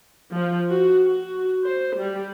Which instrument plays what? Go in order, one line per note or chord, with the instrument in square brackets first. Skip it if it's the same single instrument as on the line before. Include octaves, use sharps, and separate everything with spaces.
[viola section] F3
F#4
F#4
C5
G3